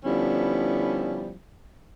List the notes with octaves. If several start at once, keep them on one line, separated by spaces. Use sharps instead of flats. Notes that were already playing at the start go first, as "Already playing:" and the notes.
D3 F3 G3 B3 C#4 E4